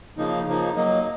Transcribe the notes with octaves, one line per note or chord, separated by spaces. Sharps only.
C#3 F3 A#3 D#4
C#3 F3 A#3 D#4
F#3 A#3 D#4